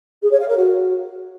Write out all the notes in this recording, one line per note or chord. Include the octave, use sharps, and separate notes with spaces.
G#4
C#5
F5
A#4
F#4